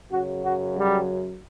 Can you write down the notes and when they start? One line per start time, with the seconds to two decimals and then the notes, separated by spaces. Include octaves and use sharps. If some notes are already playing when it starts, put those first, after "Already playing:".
0.11 F#2 C#3 F#3 F#4
0.43 F#4
0.77 G3